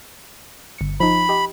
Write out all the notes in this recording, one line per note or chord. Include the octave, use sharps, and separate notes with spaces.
G1 C#7
F3 D#4 B5
G4 D#5